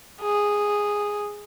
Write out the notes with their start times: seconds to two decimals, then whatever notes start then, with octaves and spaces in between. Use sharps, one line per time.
0.21 G#4